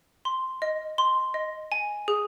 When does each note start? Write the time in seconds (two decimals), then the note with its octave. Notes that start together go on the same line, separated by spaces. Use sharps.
0.25 C6
0.62 D#5
0.98 C6
1.34 D#5
1.72 G#5
2.08 G#4